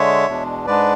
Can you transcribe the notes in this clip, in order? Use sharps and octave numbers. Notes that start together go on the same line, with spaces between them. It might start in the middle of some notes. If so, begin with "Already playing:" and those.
Already playing: D3 G#3 C#5 E5
E2 B2 G#3 D4
G#2 G#3 D4 B4 D5